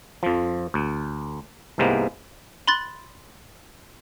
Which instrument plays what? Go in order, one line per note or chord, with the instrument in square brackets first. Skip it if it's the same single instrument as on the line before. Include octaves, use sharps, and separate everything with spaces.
[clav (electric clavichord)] F2 F3
D2
C2 G#2 C3 G#3 A#3 B3
[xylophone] B5 C6 F#6 A6